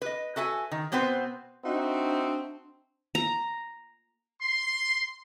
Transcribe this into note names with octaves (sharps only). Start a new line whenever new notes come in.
B4 D#5
F#4 A4 E5 G#5
D#3
B2 B3 C4 B4 C5
C4 D4 D#4 F#4 E5
A#5
C6